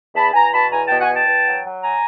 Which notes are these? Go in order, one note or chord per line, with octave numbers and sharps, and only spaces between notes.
E2 A5 B5
E2 G#5 A#5
B2 A5 B5
E2 G#5 A#5
B2 G5 A5
F#5 G#5
E2 G5 A5
E2
F#3
F#3
G#5 A#5